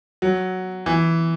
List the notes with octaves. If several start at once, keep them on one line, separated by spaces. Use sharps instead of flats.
F#3
E3